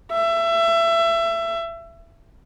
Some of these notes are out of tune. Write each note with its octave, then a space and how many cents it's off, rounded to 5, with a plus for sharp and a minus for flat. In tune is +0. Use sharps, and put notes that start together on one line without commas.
E5 +25